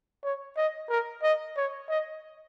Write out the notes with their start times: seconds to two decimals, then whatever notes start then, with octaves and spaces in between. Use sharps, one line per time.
0.24 C#5
0.57 D#5
0.89 A#4
1.23 D#5
1.57 C#5
1.89 D#5